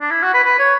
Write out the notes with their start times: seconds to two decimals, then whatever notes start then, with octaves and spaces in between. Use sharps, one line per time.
0.01 D4
0.11 E4
0.22 F#4
0.34 B4
0.44 B4
0.59 C#5